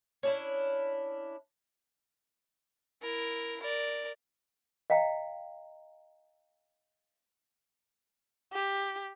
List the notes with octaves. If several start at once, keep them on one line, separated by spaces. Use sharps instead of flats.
C#4 D4 E4
E4 A#4
A#4 D5
D#5 F5 G5 A#5
G4